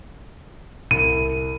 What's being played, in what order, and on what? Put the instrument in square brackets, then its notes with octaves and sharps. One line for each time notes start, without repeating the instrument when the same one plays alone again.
[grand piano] C2 [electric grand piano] D#7